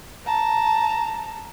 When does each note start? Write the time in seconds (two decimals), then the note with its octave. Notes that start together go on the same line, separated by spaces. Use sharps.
0.25 A5 A#5